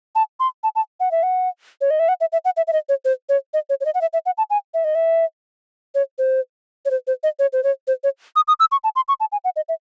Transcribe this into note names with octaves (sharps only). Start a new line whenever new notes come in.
A5
C6
A5
A5
F#5
E5
F#5
C#5
D#5
E5
F#5
E5
E5
F#5
E5
E5
D#5
C#5
C5
C#5
D#5
C#5
C#5
D#5
F#5
E5
E5
F#5
A5
G#5
E5
D#5
E5
C#5
C5
C#5
C5
C5
D#5
C#5
C5
C#5
C5
C#5
D#6
D#6
E6
C#6
A5
C6
C#6
A5
G#5
F#5
D#5
E5